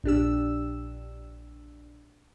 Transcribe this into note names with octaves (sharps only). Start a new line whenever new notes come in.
A#1 D4 G4 E6